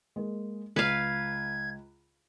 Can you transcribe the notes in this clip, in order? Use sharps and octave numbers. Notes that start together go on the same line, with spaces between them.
G#3 A#3
C#2 B4 F5 G#6